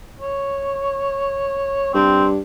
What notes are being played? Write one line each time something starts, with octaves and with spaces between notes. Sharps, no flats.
C#5
G2 C4